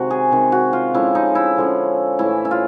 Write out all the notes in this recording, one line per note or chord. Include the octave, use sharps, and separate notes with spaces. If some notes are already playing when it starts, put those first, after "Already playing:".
Already playing: C3 D#3 G#3 F#4
G#4
C3 D#3 G#3
F#4
F4
D3 F3 G#3 C#4 E4
D#4
E4
D3 F3 G#3 C#4
A2 E3 A3 C#4 E4
E4
F4